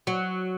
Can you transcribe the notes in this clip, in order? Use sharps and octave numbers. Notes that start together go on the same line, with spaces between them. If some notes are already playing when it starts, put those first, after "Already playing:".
F#3